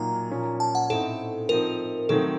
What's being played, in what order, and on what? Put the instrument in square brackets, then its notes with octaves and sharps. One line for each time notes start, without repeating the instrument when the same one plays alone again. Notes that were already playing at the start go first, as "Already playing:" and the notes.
Already playing: [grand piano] A#2 F#3 A#3 D#4 [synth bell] A#5
[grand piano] A#2 F3 A#3 C#4
[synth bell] A5
F#5
[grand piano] A2 A3 C4 D#4 [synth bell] A4
[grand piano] F3 C4 D#4 [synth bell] A#4
[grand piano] D#3 F#3 A3 C4 D#4 [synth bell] A4